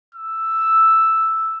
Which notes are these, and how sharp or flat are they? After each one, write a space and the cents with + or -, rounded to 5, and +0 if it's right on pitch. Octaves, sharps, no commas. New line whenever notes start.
E6 +0